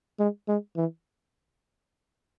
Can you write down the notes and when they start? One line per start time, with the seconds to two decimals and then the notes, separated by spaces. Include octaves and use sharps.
0.19 G#3
0.48 G#3
0.76 E3